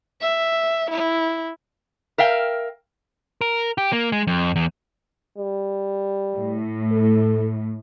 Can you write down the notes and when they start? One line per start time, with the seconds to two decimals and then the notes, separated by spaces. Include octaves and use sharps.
0.21 E5
0.91 E4
2.18 A#4 E5 F5 G5
3.41 A#4
3.78 G4
3.93 A#3
4.12 G#3
4.27 F2
4.56 E2
5.37 G3
6.36 A2
6.92 A4